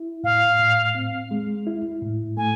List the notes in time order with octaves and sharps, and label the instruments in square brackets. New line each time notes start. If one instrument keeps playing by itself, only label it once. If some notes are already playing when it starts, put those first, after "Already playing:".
Already playing: [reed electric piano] E4
[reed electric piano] A2 [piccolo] F5
[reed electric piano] A2
C4
G#3
E4
A2
[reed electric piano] A3 [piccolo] G#5